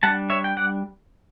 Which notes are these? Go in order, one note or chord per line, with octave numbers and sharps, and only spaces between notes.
G3 D4 F#5 A5
C#5 E5
G5
D5 F#5